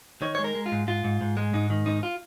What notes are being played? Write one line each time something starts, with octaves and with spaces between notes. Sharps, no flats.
D#3 C#5
G#3 C#5
A#4
G#3
F4
G#2
G#2 F4
G#2
G#2
G#3
G#2 D#4
D#3
G#2 D#4
F4